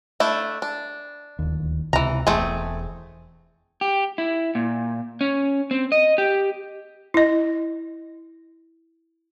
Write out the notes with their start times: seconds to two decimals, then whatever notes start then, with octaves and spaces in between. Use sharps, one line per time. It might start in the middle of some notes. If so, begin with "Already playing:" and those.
0.20 A3 D4 E4
0.62 D4
1.39 D1 D#2
1.93 C#2 C3 E3 A#5
2.27 E1 E2 A3 C4 G#4
3.81 G4
4.18 E4
4.55 A#2
5.21 C#4
5.71 C4
5.92 D#5
6.18 G4
7.14 E4 D#5